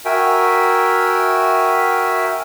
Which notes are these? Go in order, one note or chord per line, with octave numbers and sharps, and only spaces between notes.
F#4 A#4 E5 G5 G#5